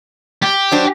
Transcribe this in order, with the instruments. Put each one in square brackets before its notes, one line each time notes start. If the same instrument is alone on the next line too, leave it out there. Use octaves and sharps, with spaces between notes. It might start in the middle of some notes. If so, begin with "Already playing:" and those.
[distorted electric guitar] G4
[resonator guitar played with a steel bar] F#3 D4 C5